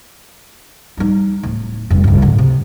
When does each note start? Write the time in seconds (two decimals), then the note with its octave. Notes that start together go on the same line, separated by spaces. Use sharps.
0.97 G3 D#4
1.43 D1
1.90 F1 G2
2.04 C#2 G2
2.22 A2 D3
2.38 C3